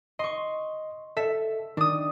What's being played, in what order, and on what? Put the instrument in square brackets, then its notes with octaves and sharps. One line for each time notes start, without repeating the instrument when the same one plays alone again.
[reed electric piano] D#5 [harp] C6 C#6
[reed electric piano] A4 [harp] E5
[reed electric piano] D#3 [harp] D4 D#6